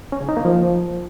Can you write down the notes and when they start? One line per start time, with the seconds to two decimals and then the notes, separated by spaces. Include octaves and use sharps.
0.12 C#4
0.20 C#3
0.29 D#4
0.37 A#3
0.45 F3